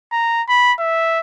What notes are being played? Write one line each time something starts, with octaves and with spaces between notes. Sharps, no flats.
A#5
B5
E5